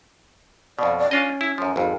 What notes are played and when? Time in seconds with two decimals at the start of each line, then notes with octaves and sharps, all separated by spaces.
0.79 F2 B2 D5
0.98 D5
1.11 C#4 D4 F4 D#5
1.41 E4
1.58 F#2 F3
1.76 G#1 F2